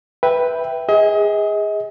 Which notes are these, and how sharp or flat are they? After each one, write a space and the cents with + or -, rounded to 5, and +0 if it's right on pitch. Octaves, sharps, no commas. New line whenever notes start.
B4 +0 E5 -5 G5 +0
G#4 -20 D#5 +35